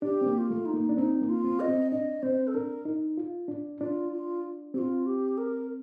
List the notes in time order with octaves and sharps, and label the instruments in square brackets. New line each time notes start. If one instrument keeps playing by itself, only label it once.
[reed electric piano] D4 [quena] G4
[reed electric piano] C4
A#3
[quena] G4
F4
[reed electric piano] A3
[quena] D#4
[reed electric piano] A#3
D4
[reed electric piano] C4 [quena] D#4
[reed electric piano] A#3
[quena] F4
[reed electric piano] C4
[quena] D#5
[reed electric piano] C4
[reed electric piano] D4 [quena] D#5
[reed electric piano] C4 [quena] C5
[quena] A4
[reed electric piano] D4 [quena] A#4
[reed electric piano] D#4
F4
D4
[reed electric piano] D4 [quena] F4
[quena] F4
[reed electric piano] C4 [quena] G4
[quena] F4
G4
A#4